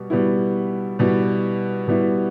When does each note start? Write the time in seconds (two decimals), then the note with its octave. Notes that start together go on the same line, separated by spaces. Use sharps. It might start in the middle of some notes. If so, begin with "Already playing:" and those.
Already playing: B2 G3
0.10 B2 G3 B3 E4
0.99 B2 G3 B3 E4
1.88 B2 G3 B3 E4